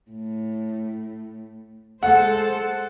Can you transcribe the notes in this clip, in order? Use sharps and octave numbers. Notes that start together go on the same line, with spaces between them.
A2
G#3 A4 C5 F#5